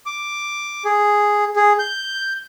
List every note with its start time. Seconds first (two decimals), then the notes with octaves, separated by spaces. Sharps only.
0.06 D6
0.85 G#4
1.56 G#4
1.79 G6